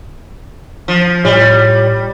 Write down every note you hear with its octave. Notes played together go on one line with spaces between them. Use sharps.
F3
A2 G3 F4 C#5